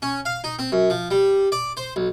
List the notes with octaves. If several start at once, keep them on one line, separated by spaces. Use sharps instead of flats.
C#4
F5
D#4
C4
F#2
F3
G3
D5
C5
B1